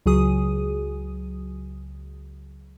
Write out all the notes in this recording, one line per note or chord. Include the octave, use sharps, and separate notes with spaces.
C#2 F#3 G#4 D#6